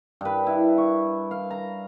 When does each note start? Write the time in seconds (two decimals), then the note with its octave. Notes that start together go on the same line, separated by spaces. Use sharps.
0.21 G2 B4
0.47 E4
0.78 C#6
1.31 F5
1.51 A#5